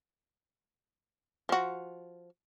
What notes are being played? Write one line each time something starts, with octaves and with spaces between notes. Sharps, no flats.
F3 F#4